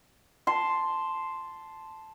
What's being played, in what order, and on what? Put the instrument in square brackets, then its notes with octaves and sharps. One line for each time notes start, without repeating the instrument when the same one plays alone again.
[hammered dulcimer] A5 C6